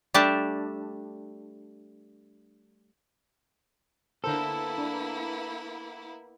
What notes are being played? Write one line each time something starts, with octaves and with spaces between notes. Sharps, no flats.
G3 A3 D4 G5 A5
D3 A#3 B3 E4 A4 A#4 C5
D4